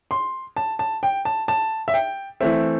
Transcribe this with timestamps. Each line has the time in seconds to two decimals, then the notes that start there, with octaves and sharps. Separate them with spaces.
0.11 C6
0.57 A5
0.79 A5
1.03 G5
1.25 A5
1.48 A5
1.88 E5
1.94 G5
2.40 E3 A3 C4 E5